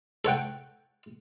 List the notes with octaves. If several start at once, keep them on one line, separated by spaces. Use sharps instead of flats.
A4 C#5 F#5 G5